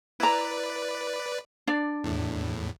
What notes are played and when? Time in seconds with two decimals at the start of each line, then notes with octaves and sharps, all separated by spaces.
0.20 E4 B4 D5 A#5
1.67 D4 D5
2.04 E2 A2